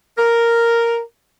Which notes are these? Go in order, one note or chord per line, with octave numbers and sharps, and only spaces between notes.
A#4